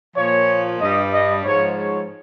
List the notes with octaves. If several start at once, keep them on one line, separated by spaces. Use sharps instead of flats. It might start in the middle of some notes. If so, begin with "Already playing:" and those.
A#2 F3 C#5
G2 G3 D#5
D#5
G#2 F3 C#5
C#5